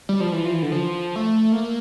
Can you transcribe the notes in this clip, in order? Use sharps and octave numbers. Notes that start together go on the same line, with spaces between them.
G3
F3
E3
F3
E3
D3
F3
A3
A#3